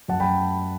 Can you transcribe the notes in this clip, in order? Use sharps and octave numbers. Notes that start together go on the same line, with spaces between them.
F#2 F#5 A5
G5 B5